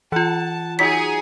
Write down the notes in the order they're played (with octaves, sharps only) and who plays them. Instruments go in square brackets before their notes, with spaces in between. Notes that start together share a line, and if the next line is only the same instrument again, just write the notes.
[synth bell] E3 F4 [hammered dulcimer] F#5 [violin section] A5
[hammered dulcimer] F#3 D#4 C#5 [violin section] G#4 [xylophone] B6